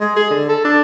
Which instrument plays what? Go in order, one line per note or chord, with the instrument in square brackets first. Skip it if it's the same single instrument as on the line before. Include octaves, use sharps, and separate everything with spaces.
[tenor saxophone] G#3
G#4
D3
A4
D4